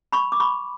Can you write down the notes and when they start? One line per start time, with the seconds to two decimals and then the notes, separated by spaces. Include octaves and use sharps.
0.13 B5 C#6
0.32 D6
0.40 B5 C#6